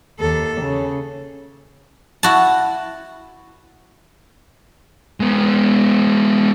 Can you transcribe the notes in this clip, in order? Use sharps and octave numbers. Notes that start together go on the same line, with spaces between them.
D#2 A4
C#3
E4 F#4 A5
G#3 B3